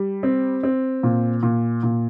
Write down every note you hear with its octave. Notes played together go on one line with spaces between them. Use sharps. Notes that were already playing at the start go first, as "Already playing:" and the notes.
Already playing: G3
C4
C4
A#2
A#2
A#2